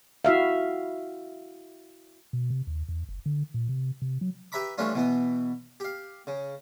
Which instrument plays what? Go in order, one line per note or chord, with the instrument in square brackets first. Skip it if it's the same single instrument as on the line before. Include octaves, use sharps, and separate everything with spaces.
[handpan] E4 F#4 E5 F5
[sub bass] B2
C3
D#2
E2
F#1
D3
A#2
C3
C3
F#3
[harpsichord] G4 B4 E5 A#5 B5 D6
E3 G3 A3 C#4 D4 F4
B2 E3 B3
G4 F5
C#3